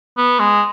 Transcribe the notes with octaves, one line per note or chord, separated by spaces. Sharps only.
B3
G#3